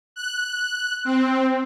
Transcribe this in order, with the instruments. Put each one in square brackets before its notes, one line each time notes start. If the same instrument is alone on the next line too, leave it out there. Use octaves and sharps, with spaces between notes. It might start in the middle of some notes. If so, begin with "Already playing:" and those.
[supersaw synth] F#6
C4